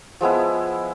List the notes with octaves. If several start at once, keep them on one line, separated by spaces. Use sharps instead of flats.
F3 G#3 B3 E4